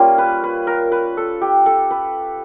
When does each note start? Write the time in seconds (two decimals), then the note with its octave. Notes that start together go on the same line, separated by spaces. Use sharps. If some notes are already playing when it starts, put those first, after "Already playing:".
Already playing: G3 A#3 C#4 F4
0.18 B4
0.43 B4
0.67 A#4
0.92 B4
1.17 A4
1.41 G4
1.66 A4
1.91 B4